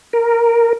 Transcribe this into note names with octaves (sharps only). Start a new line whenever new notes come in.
A#4